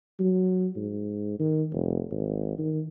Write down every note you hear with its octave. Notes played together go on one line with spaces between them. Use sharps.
F#3
G#2
D#3
F1
G#1
D#3